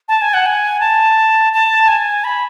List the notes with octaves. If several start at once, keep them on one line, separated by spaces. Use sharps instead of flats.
A5
G#5
F#5
G#5
A5
A5
G#5
B5